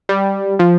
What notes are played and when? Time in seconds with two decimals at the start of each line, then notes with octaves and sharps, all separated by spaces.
0.09 G3
0.59 F3